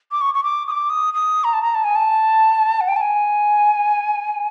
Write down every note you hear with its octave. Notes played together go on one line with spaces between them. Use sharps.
D6
C#6
C#6
D6
D#6
D6
D#6
D#6
A#5
A5
A#5
A5
G#5
A5
F#5
G5
A5
G#5